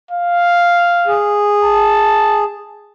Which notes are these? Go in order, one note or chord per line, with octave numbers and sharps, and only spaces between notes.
F5
G#4
A5